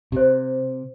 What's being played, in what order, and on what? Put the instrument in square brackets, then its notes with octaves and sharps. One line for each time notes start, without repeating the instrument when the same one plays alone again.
[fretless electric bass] C3 [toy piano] G4 C5